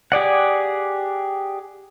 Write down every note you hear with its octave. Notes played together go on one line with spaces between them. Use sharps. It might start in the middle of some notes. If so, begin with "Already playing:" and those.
G4 G#4 D5 F#5